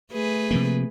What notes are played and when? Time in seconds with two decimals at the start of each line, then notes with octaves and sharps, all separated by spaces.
0.12 A3 G#4 B4
0.51 C3 F3 A#3